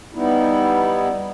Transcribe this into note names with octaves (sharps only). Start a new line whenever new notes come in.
G3 B3 D#4 E4